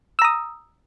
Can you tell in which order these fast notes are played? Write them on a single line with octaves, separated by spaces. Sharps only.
E6 A#5 D#6